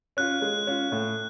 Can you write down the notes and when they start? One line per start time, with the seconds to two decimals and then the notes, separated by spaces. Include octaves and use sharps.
0.17 C#4 F4 F#6
0.42 G#3
0.67 C#4 F4
0.92 A2